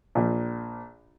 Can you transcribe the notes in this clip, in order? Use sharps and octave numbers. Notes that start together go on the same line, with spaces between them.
A#1 A#2